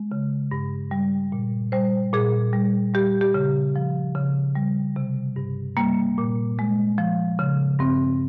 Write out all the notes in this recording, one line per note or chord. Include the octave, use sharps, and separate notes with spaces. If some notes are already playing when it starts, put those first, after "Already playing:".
Already playing: G#3
C#3
G2
G3
A#2
G3 C5
A#2 G#4
G3
G3 G4
G4
C#3
F3
C#3
G3
C3
G2
G3 A#3
A#2
G#3
F3
C#3
G2 C4